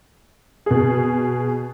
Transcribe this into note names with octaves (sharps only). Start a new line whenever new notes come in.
B2 G#4